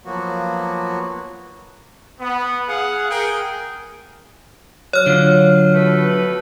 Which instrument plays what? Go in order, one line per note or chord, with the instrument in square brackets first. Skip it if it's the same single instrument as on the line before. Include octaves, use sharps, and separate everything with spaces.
[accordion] F3 F#3 A#3 B3 F#4
[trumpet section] B3
G#4 F5 F#5
G#4 A#4 G5
[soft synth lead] F#3 [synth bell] C#5 F6
[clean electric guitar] D3 F4
[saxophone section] B2 A3 B4